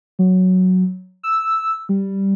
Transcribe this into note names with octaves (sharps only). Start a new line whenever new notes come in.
F#3
E6
G3